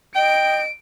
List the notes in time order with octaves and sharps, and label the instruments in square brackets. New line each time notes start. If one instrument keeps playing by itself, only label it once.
[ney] D#5 [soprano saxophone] G5 [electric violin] D7